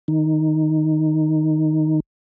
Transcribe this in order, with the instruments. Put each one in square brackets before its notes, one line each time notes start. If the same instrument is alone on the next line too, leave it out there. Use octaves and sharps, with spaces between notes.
[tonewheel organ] D#3 D#4